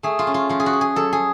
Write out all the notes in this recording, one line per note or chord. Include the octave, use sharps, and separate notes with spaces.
A3 G#4
F4
C#4
F4
F3 F4
G#4
F#4
F3
G#4
F#3 A4
G#4